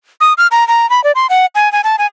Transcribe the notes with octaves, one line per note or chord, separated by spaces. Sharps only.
D#6
F6
A#5
A#5
B5
D5
C6
F#5
G#5
G#5
A5
G#5